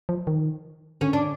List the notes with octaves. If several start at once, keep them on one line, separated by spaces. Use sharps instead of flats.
F3
D#3
D3 C#4
D4